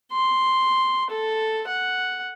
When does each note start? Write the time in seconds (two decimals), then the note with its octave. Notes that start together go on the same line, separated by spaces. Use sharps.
0.12 C6
1.10 A4
1.67 F#5